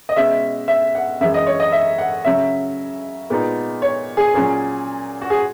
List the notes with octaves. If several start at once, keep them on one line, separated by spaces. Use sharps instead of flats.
D#5
B2 G#3 C#4 E5
E5
F#5
F#2 E3 G#3 E5
D#5
C#5
D#5
E5
F#5
C#3 F#3 C#4 E5
A#2 G#3 B3 D#4
C#5
G#4
A#2 F#3 C#4
F#4
G#4